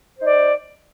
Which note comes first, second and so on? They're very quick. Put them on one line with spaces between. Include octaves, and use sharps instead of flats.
C5 D#4 D5